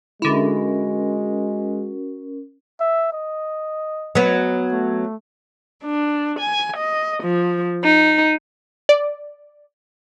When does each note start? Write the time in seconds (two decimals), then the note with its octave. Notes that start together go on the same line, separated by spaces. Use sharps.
0.22 D3 G#3 C#4 E4 F#4 A#4
2.80 E5
3.13 D#5
4.15 F#3 B3
4.71 A3
5.83 D4
6.39 G#5
6.77 D#5
7.23 F3
7.84 D#4
8.89 D5